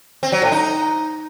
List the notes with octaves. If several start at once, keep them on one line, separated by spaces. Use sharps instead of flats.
C4
F#3
A2
D#4